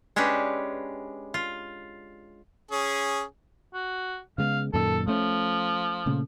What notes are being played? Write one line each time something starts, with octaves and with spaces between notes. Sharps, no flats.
G#3 C#4 D4 G4 B4
F4
C#4 G#4
F#4
C#3 G#3 B3 F5
F#2 A#2 D#3 A4
F3 A3 C#4
A#2 C#3 A3